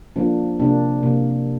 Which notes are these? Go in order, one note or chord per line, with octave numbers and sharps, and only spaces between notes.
F3 A#3 D4
C3 A#3 D4
C3 A#3